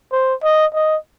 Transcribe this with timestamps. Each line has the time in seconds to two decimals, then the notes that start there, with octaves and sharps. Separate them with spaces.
0.12 C5
0.44 D#5
0.75 D#5